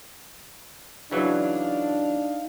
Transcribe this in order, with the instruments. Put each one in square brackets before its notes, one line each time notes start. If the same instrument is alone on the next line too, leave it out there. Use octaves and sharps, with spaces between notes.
[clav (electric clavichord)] C#3 E3 F#3 [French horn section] D4 [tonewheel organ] D#4 F5